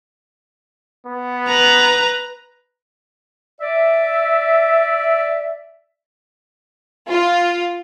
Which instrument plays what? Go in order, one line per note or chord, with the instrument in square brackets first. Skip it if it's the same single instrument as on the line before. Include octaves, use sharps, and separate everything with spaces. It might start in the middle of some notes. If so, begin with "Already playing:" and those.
[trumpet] B3
[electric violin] B4 A#5
[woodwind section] D5 E5
[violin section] F4